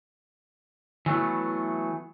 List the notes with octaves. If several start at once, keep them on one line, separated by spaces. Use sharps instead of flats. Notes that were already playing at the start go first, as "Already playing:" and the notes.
E3 F#3 A3 B3